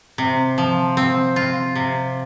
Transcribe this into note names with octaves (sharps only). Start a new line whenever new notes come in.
C3
F3
C4
F4
C3